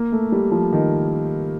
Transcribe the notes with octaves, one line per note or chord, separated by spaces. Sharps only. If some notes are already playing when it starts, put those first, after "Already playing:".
Already playing: A#3
A3
G3
F3
D#3